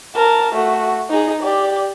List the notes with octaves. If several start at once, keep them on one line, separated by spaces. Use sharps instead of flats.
A#4 A5
A3 F#4
D#4 G#4
G4 D5